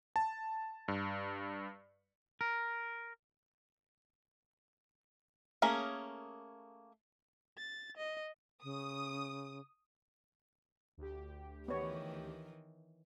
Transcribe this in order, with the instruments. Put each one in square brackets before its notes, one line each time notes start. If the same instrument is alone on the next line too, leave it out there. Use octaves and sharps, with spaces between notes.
[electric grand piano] A5
G2
[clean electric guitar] A#4
[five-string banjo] A3 A#3 C#4 G#4 A#4
[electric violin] A6
D#5
[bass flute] C#3 [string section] D#6
[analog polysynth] D2 G4
[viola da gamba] D#3 E3 [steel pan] B3 C#5